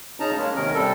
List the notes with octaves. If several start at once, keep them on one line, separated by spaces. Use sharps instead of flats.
C#3 C#4 D#4 A5 A#5
G#3 A#3 C#4
D#2 C3 D#3 C#4 A#4
C3 G3 A4